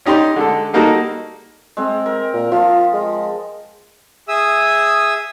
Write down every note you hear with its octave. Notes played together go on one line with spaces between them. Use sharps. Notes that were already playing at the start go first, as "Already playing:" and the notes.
C#4 D#4 G4 D5 C6
D3 G#3 A4
G3 A#3 D#4 F#4 G#4 A4
G#3 C4
A#4
A#2
F3 F4
G#3
G#4 E5 D#6 E6